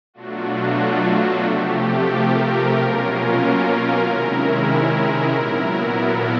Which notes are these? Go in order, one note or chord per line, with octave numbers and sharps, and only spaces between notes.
B2 F#3 A3 D4 F4 F#4
C3 F3 A3 G4
A#4
B2 F#3 A#3 C#4 F4
A#4
C3 D#3 G#3 C#4 E4
A#2 F#3 B3 E4
A4